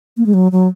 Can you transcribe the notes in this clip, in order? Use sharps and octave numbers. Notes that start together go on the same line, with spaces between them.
A#3
G#3
F#3
F#3